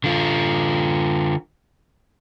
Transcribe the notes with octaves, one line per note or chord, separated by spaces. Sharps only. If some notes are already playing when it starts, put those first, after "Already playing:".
D3 F4